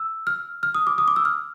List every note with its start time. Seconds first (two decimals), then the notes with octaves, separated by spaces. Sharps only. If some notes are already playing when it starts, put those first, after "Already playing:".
Already playing: E6
0.27 F6
0.63 F6
0.75 D#6
0.87 D6
0.98 D#6
1.08 D6
1.16 E6
1.25 F6